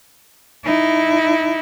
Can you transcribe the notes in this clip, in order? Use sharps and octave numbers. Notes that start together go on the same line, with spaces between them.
D#4 E4